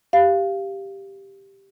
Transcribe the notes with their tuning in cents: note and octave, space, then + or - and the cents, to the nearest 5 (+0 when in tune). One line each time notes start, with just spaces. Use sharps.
G4 +0 F5 -15